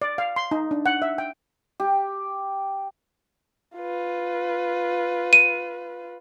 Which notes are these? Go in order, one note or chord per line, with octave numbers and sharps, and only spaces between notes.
D5
F5
C6
D#4
D4
F#5
E5
G5
G4
F4 B4
D#7